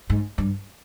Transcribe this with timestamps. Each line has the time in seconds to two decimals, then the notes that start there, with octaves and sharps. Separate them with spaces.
0.10 G#2
0.38 G2